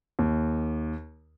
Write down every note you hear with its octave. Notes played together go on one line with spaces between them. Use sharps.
D#2